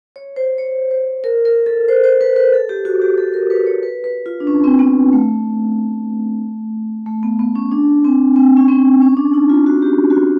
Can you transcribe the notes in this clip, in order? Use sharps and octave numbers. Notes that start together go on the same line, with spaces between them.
C#5
C5
C#5
C5
A#4
A#4
A4
C5
C5
B4
B4
A4
G4
F#4
G4
A4
A#4
B4
C#5
B4
B4
F4
D4
C#4
C4
B3
A3
A3
B3
B3
C#4
D4
C4
C4
C#4
C4
C#4
D4
D#4
F4
F#4
G4
F#4
F4